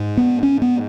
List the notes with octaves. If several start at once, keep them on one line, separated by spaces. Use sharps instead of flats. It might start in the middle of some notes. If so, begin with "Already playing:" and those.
Already playing: G#2
B3
C#4
B3